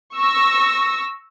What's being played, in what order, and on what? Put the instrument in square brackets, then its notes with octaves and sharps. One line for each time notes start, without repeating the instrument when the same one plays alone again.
[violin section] C#6 E6 A#6